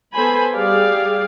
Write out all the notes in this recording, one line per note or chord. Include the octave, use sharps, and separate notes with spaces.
B3 A4 C5 G#5 B5
G3 G4 G#4 D5 F5